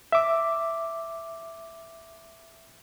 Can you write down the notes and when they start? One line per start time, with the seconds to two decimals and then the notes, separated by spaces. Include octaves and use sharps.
0.12 E5 D6